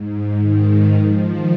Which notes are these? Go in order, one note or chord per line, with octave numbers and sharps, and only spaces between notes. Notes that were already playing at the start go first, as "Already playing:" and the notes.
Already playing: G#2
D#3
F3
D#3